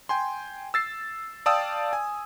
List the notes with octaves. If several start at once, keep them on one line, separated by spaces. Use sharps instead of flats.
G5 G#5 C6
E6 A6 C7
D5 F5 G5 A5 D#6 E6
G#5